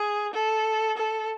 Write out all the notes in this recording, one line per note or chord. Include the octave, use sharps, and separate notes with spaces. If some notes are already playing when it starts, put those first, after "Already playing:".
Already playing: G#4
A4
A4